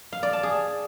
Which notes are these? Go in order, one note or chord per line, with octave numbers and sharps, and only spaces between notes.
F5
D5
A5
G#4